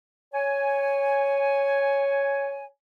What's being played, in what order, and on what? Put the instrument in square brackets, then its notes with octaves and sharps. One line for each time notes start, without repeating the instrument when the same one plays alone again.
[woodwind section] C#5 G#5